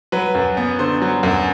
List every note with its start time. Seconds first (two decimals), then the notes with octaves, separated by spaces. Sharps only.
0.12 F#3 B4
0.35 F#2
0.57 B3
0.79 D3 C5
1.02 F#3
1.23 F#2